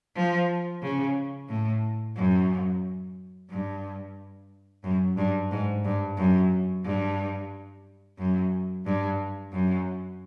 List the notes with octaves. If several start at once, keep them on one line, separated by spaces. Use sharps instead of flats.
F3
C#3
A2
F#2
G2
F#2
G2
G#2
G2
F#2
G2
F#2
G2
F#2